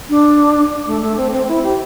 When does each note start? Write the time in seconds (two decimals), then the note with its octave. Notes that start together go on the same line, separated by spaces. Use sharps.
0.09 D4
0.86 A3
1.01 A3
1.17 C4
1.32 C4
1.48 E4
1.63 G4